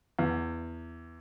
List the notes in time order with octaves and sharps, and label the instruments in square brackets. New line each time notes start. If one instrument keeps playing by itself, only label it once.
[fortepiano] E2